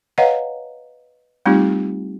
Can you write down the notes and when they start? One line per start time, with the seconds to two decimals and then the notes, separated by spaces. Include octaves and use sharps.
0.18 B4 C#5 D#5 F5 F#5 A#5
1.46 G3 A3 C4 D#4 F4 G4